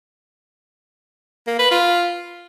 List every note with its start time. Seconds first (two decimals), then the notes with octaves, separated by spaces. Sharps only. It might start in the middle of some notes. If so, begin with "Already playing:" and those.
1.47 A#3
1.59 B4
1.71 F4